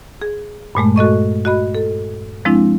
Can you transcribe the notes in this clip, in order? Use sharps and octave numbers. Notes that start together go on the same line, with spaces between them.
G#4
G2 A#2 G#3 A3
F#4 A4 D#5 C#6
F#4 D#5 B5
A4
F3 G#3 C4 D4 E4